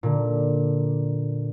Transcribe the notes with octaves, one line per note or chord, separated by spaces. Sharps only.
A#2 D3